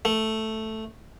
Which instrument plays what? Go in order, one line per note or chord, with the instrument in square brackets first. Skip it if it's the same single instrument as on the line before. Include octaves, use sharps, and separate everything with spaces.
[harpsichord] A3